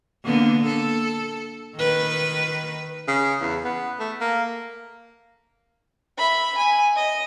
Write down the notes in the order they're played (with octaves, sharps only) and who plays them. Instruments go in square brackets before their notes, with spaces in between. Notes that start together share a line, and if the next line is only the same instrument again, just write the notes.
[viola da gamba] D3 A#3 B3
A4
D#3 B4
[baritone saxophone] C#3
E2
B3
A3
A#3
[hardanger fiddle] E5 B5
G#5
D#5